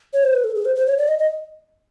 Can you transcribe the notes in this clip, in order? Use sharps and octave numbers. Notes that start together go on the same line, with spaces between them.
C#5
C5
B4
A4
G#4
C5
C5
C#5
D5
D#5
D#5